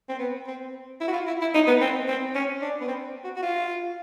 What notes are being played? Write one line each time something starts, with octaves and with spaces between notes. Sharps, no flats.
C4
B3
C4
E4
F#4
F4
E4
E4
D#4
B3
C4
C4
C#4
D4
B3
C4
F#4
F#4
F4